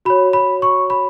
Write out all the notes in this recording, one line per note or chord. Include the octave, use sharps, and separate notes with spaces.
F#4 C#5 B5
B5
C#6
B5